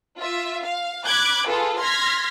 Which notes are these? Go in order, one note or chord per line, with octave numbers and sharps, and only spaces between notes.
F4 E5
F5
B5 D6 F#6 G#6
F4 G#4 A4 B4
C6 F6 G#6 A#6 B6